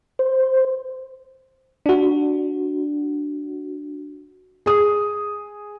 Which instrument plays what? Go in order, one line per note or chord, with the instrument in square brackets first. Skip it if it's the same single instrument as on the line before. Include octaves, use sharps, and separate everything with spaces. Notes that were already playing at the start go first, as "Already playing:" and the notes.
[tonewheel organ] C5
[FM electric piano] D4 F#4
[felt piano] G#4 D#6